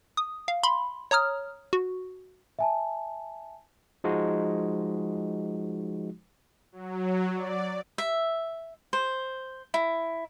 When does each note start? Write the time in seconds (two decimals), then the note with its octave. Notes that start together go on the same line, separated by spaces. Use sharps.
0.17 D#6
0.48 F5
0.63 B5 C6
1.11 C#5 A#5 D#6 F6
1.73 F#4
2.59 E5 G#5 A5
4.04 F3 G#3 D#4 F#4
6.72 F#3
7.34 D5
7.98 E5
8.93 C5
9.74 E4